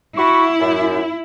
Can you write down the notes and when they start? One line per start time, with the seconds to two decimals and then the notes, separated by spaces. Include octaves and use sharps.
0.18 E4 F#4 B5 C#6
0.60 F#2